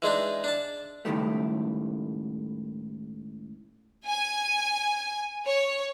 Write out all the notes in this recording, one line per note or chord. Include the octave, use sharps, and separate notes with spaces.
E3 G#3 D4 D#4
D4 A5
C#2 A2 C3 D#3 G3 A3
G#5
C#5